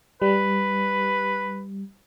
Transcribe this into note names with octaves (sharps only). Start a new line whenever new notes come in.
G3 B4